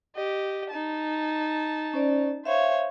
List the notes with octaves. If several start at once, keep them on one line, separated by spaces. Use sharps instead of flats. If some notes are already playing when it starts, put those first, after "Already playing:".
G4 D#5
D#4 A5
C#4 C5 D5
C5 C#5 E5 F5